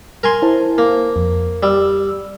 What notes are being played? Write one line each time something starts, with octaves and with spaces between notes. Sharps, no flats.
A#4 G#5 C6
E4 C5 A5
A#3
F2
G3 E6